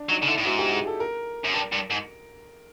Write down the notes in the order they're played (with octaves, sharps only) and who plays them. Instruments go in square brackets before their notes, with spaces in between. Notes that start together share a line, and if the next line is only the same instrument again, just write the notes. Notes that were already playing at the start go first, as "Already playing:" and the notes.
Already playing: [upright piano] D4
[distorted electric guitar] F#3 [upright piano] D#4
[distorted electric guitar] C#3
[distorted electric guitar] D3 [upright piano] E4
[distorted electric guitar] A2
[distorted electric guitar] G#2 [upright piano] F#4
[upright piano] G4
G#4
A4
A#4
[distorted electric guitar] F#2
G2
G2
G#2